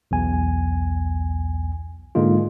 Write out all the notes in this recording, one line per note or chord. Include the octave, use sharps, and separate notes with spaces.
B1 E2 G#5
G#2 D3 G#3 A#3 F4